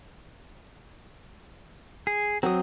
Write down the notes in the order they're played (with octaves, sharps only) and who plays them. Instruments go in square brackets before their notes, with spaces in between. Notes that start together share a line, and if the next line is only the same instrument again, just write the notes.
[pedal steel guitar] G#4
[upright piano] F#3 [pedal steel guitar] C4 D#6